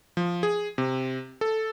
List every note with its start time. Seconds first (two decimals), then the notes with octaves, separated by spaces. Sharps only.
0.17 F3
0.43 G#4
0.78 C3
1.41 A4